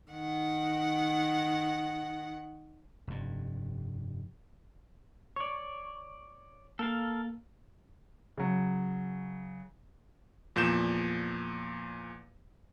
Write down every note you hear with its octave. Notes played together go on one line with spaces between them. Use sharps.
D#3 F#5
F1 G2
C#5 D5 C#6
A#3 A4 A#4 F5
C#3 F#3
E2 A#2 F3 G6 E7